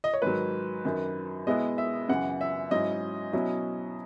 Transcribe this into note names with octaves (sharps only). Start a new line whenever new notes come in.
D#5
C#5
G#2 D#3 F#3 B4
F#2 D#3 F#3
B2 G#3 B3 E4 D#5
E5
F#2 C#3 E3 F#5
E5
G#2 F#3 C#4 E4 D#5
B2 F#3 C#4 E4